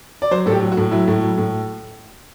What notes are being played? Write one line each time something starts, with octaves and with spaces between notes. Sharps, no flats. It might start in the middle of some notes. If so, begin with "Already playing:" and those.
D5
F#3 C5
A2 A4
G4
F#3
F#4
A2
F#3 E4
A2
F#3
A2